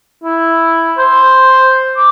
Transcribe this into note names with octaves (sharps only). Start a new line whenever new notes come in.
E4
C5
D6